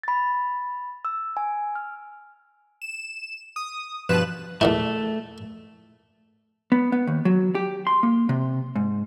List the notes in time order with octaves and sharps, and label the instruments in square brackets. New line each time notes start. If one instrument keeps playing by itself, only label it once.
[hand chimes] B5 A6
E6
G#5
F6
[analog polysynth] E7
D#6
G2 B2 F3 B4 F#6 E7
[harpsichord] E2 A#2 E4 [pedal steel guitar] A3
[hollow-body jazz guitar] B3
B3
D#2
F#3
G4
C6
A#3
C3
G#2